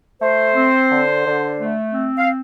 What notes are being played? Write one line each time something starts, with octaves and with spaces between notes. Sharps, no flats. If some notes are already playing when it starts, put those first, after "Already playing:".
A3 C5
C4
D3
D3
A3
C4
F5